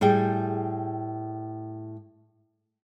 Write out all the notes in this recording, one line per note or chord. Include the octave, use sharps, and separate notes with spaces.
A2 G3 G#4 G5